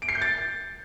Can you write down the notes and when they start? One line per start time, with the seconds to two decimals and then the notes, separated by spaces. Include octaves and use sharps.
0.02 D7
0.09 C7
0.15 G6
0.22 A6